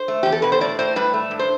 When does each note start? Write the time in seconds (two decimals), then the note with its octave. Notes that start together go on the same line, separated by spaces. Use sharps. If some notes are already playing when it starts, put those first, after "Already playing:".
Already playing: C5
0.08 A3
0.23 E2 G4
0.32 A4
0.42 B2 B4
0.52 C5
0.61 A2 D5
0.79 A2 C5
0.96 G3 B4
1.14 A3
1.31 G2
1.39 C5